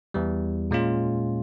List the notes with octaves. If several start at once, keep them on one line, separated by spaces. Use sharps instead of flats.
E2 E3 G3
A#2 G#3 C#4 F4